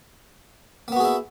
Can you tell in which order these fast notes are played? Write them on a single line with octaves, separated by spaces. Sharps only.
A#3 B3 F#4 G#4 E4